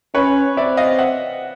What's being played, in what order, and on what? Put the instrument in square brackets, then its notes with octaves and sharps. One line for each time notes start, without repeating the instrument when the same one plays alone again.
[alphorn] C#4 [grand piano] B4 C#5
[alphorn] C4 [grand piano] D5 E5
[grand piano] D#5 F5
E5 F#5